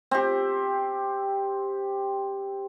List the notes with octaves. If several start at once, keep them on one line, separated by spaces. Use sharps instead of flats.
C4 G4